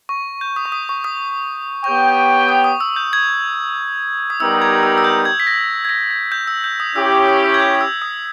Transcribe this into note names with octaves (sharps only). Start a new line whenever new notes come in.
C#6
G6
D#6
C#6
D#6
C#6
D#6
B3 G4 C#5 G5 C#6
D#6
D#6
E6
G6
G#6
D#6
G3 B3 D#4 G4 A#4 E6
G#6
E6
E6
G6
G#6
B6
A#6
G#6
A#6
G#6
G6
E6
G6
D#6
C#4 E4 G4 C#5 E6
G6
D#6
E6
G#6
G6
D#6
E6
D#6